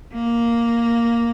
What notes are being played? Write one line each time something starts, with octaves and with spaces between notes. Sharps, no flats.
A#3